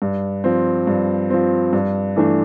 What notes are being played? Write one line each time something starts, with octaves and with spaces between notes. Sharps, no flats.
G2
F3 C4
G2
F3 C4
G2
E3 A3 D4